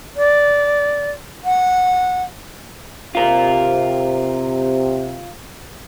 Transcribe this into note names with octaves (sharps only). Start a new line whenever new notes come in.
D5
F#5
C3 F4 A#4